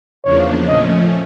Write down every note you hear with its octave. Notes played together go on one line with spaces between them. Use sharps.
E2 C#3 F3 A#3 D4 C#5
A#2 F3 A3 C#4 D#5